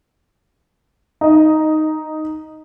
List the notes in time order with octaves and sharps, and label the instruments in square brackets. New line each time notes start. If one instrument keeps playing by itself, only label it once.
[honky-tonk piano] D#4 D#5